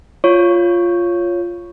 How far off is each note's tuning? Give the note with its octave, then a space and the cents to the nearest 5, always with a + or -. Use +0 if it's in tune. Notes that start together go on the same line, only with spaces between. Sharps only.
F4 +0 C#5 +0 C#6 +0